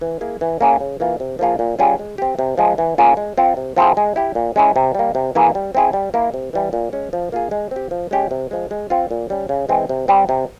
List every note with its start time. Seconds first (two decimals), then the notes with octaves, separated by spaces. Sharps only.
0.01 E3
0.21 A#3 E4 G#4
0.41 E3
0.61 A#3 C#4 E4 G#4
0.80 C#3
1.00 E3 A#3 F4
1.20 C3
1.39 F3 A#3 F4 G#4
1.59 A#2
1.79 G3 C#4 F4 G#4
1.99 G#3
2.18 C4 G4
2.39 C3
2.58 F3 G#3
2.78 E3
2.98 A#3 C#4 F4 G#4
3.17 G#3
3.38 C4 F4
3.57 C3
3.76 F3 C4 E4 G#4
3.97 G#3
4.16 E4 G4
4.35 A#2
4.56 G#3 C#4 E4
4.76 C3
4.95 G3 A#3
5.15 C3
5.35 E3 A#3 E4 G#4
5.55 G3
5.75 C4 E4 G#4
5.93 G3
6.14 A#3 E4
6.34 C3
6.53 E3 G3
6.73 A#2
6.93 G#3 C#4
7.13 F3
7.32 A#3 F4 G#4
7.51 G#3
7.71 C4 G4
7.91 F3
8.11 G#3 C#4 G4
8.31 C3
8.51 F3 G#3
8.71 G#3
8.90 C4 F4
9.11 A#2
9.30 G3 C#4
9.49 C#3
9.69 E3 G#3 C4
9.89 C3
10.08 G3 C4
10.29 C3